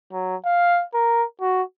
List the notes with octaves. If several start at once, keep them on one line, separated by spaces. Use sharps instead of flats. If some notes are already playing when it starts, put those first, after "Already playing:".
F#3
F5
A#4
F#4